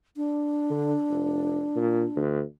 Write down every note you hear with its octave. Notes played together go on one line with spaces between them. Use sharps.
D4
D3
F1
A#2
D2